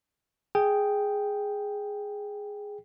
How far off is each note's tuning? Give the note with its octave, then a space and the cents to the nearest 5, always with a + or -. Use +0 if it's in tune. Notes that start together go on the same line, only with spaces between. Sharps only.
G#4 +0 G5 +0